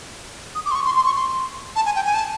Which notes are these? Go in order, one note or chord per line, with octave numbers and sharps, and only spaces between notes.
D#6
D6
C6
C#6
C6
C6
C#6
C6
A5
G#5
G5
G#5
A5